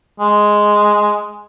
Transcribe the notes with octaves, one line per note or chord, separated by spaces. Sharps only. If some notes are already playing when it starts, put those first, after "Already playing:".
G#3